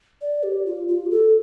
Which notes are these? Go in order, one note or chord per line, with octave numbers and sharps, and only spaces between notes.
D5
G4
F4
F4
G4
A4